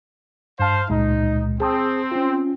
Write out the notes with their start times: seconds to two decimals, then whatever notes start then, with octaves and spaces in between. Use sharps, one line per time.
0.60 G2 C5 F5 A5
0.89 C#2 A#2 G#3 D#4
1.60 C4 G#4 A5 D#6
2.12 C#4 F4